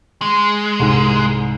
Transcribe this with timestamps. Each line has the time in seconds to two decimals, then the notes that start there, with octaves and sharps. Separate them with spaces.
0.22 G#3
0.80 C2 G#2